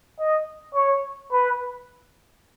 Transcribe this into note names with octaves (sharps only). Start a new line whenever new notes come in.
D#5
C#5
B4